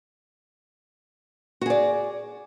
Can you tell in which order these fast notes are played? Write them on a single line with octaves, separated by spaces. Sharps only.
F#4 G#4 D5